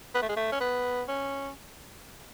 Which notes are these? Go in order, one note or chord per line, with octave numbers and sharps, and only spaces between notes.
B3
A3
G#3
A3
C#4
B3
C#4